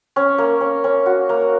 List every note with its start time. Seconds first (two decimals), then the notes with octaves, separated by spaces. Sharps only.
0.16 C#4
0.38 A#3
0.61 C#4
0.84 C#4
1.06 F#4
1.29 A#3